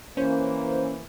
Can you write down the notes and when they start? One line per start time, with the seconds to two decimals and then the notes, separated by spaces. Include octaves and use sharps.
0.17 E3 A#3 C#4 C5